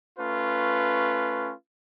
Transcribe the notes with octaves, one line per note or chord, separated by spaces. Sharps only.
A3 C#4 F4 B4